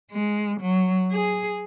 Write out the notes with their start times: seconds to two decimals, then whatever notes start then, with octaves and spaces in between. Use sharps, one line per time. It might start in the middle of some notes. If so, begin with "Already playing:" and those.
0.12 G#3
0.61 F#3
1.12 G#4